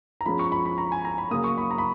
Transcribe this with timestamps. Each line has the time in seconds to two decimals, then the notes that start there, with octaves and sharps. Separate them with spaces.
0.21 A#5
0.26 F3 G#3 C#4 B5
0.39 C#6
0.52 B5
0.66 B5
0.78 A#5
0.92 G#5
1.05 A#5
1.18 B5
1.31 C#3 F#3 A#3 D#6
1.44 C#6
1.57 B5
1.71 A#5
1.78 B5